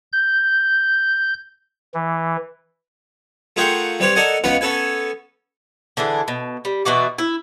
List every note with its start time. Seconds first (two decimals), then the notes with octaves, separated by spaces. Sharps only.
0.12 G6
1.94 E3
3.56 A3 F4 G#4 A#4 F#5 G5
4.00 G3 C4 G4 B4 C#5
4.15 A4 A#4 D5 D#5 F#5 G#5
4.44 C#2 B3 C#4 F4 F#5 B5
4.61 B3 C#4 A4 B4 G#5
5.97 D3 E3 D4 G#4
6.28 B2
6.65 G3
6.85 B2 E3 F#4 D5
7.18 E4